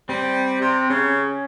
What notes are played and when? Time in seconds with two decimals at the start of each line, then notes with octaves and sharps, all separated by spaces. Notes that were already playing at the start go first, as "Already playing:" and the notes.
0.09 G3 C4
0.61 C3
0.90 C#3 C#4